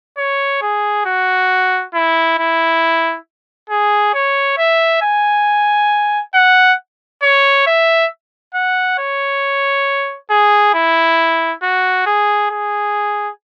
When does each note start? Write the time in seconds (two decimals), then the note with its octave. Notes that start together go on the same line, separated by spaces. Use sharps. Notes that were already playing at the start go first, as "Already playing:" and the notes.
0.18 C#5
0.62 G#4
1.06 F#4
1.94 E4
2.38 E4
3.70 G#4
4.14 C#5
4.58 E5
5.02 G#5
6.34 F#5
7.23 C#5
7.67 E5
8.54 F#5
8.98 C#5
10.30 G#4
10.74 E4
11.62 F#4
12.06 G#4
12.50 G#4